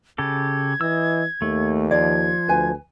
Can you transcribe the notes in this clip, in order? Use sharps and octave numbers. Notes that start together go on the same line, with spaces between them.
C#3 G4 A4 G#6
E3 D#5 E6
D#2 A3
F3 D5 G#6
D2 B4 G#5